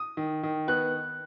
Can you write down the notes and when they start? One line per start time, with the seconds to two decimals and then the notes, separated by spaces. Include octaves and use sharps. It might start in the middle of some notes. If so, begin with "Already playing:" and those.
Already playing: D#6
0.17 D#3
0.43 D#3
0.68 B3 F#6